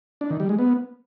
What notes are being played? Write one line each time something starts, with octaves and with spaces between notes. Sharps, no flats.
D4
D#3
G3
G#3
B3